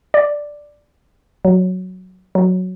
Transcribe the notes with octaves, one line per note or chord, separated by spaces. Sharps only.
D5
F#3
F#3